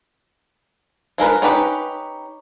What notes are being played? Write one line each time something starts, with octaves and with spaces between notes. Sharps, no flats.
F3 G#3 A#4 B4
C#4 D#4 G4 B4